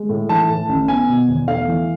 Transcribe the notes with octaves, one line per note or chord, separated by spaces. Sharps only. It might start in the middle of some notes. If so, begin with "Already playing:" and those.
Already playing: G#3
A2
E3 A5
A2
A1
B3 G#5
B2
E2
A3 F5
E3